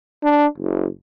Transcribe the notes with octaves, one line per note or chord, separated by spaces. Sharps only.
D4
F#1